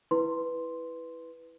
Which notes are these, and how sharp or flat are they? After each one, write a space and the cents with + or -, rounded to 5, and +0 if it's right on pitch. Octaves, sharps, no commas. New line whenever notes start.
E4 +0 B4 +0 C6 +0